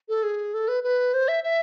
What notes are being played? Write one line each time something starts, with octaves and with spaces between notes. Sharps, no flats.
A4
G#4
A4
B4
B4
C5
E5
E5